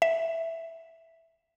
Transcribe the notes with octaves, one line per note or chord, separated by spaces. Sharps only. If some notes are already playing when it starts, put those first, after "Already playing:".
E5